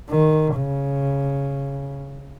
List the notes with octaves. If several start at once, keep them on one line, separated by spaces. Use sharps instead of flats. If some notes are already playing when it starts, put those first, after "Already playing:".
D#3
C#3